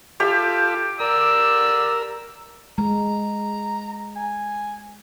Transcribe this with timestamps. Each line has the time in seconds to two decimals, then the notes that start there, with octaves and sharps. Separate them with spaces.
0.20 F4 G4 A4
1.00 A#4 D5 E6
2.78 G#3 A#5
4.16 G#5